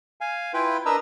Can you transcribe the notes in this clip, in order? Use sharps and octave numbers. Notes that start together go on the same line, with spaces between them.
F5 G#5
E4 F4 B4 G5
D4 A#4 B4 D#5 A#5 E6